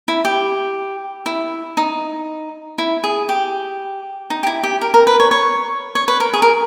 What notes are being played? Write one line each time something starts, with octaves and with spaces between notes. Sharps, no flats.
E4
G4
E4
D#4
E4
G#4
G4
D#4
G4
E4
G4
A#4
A#4
B4
C#5
C#5
C#5
B4
A#4
G#4
A#4